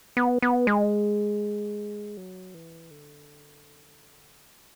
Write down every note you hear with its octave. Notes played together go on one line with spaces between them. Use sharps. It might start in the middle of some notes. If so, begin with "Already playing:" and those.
B3
B3
G#3
F#3
E3
D3